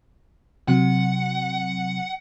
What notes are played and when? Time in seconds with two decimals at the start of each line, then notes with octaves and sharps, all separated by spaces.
0.68 C3 F#3 F#5